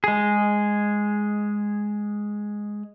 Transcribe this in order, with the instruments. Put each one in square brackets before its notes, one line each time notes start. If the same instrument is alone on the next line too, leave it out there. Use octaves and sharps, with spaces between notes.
[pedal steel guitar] G#3 G#4